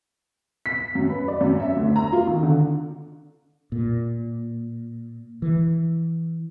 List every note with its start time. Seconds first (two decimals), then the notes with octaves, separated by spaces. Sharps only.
0.66 B6
0.95 F#2
1.10 B4
1.28 D5
1.41 F#2
1.60 E5
1.76 D2
1.96 A#5
2.13 F4
2.27 D#3
2.43 D3
3.72 A#2
5.42 E3